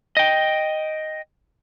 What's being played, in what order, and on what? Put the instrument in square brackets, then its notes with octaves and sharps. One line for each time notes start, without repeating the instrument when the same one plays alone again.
[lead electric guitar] D#5 G5